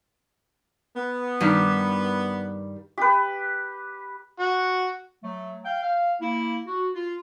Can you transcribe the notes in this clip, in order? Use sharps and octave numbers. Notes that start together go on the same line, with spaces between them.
B3
G2 D#3 G3
G4 B4
F#4
F#3 A3
F5 G5
F5
A#3 E4
F#4
F4